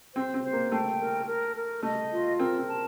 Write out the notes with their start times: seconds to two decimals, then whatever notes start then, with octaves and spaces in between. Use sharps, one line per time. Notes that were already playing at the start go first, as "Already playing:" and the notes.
0.15 C4 C5
0.34 C4
0.44 C5
0.53 A#3
0.71 A3 G5
1.00 A#4
1.27 A#4
1.55 A#4
1.83 A3 D#5
2.11 F4
2.39 C4 A#4
2.58 C4
2.67 A5